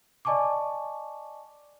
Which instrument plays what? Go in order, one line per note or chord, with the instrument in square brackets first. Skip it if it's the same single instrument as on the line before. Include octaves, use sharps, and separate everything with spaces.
[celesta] D5 D#5 G#5 A5 C#6 D6